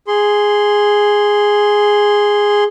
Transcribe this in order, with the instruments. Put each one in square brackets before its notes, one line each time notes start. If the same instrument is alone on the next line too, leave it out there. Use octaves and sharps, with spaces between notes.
[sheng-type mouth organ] G#4 C6